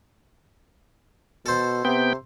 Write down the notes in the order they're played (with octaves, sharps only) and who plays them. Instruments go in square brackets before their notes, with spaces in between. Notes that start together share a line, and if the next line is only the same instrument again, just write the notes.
[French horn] B2 [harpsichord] A4 C5
[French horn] C3 [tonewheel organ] B3 G5